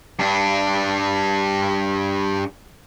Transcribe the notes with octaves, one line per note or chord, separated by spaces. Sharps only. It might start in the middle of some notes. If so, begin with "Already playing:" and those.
G2 D4